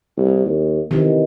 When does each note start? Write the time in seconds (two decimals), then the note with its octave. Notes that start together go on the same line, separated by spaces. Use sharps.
0.17 C2
0.46 D#2
0.91 C3 D#3 E3